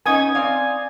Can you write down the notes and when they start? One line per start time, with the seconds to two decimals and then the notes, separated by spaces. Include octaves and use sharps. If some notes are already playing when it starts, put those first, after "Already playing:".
0.06 B3 C#4 D#4 G#5 D#6 G#6
0.35 C4 D5 F5